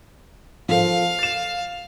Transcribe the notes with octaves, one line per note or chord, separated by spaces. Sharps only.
F3 A4 C5 F5
A6 E7